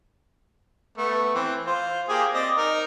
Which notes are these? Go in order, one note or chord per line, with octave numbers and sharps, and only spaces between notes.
A3 B3
E3 C4
F4 C5
A#3 G4 G#4
C4 D5 D#5
D#4 A#4